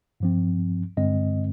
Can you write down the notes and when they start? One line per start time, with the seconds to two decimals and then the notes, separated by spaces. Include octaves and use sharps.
0.20 G2 F3 C4
0.97 G2 D3 G#3 C4 D#5